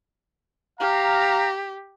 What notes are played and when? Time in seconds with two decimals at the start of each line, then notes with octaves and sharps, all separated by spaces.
0.80 G4 F5 A#5